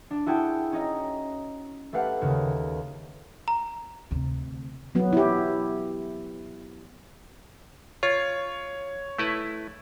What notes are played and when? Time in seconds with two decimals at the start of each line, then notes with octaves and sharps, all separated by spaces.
0.11 D4
0.26 E4 F#4 G#4 G5 A5
0.72 C#4 D#4 D#5
1.93 A3 G4 B4 F5 F#5
2.21 D#2 C#3
3.48 A#5
4.11 D2 C3
4.95 F#3 B3
5.13 E4 G4
8.03 F4 C#5
9.19 A3 E4 B4